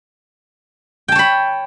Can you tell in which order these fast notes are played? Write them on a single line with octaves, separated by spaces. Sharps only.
G5 A5 C#5 B5